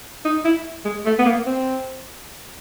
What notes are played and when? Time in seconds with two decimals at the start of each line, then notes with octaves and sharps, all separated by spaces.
0.25 D#4
0.45 E4
0.85 G#3
1.05 A3
1.19 B3
1.26 A#3
1.46 C4